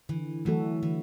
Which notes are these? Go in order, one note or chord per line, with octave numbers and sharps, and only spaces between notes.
D3 E3
E3 F#3 A3 F#4 A4
D3 E3